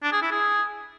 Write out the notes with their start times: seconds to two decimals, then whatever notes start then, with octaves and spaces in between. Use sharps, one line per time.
0.03 D4
0.12 G#4
0.22 E4
0.31 G#4